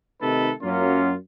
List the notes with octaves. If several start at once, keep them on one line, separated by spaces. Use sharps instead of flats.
C3 D#3 A3 D#4 A4 B4
F#2 F#3 A#3 C#4 F4